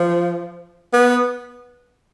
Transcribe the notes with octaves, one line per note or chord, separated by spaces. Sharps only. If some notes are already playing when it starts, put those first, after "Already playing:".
Already playing: F3
B3